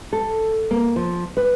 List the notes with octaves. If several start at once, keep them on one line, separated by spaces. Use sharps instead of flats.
A4
A#3
F3
B4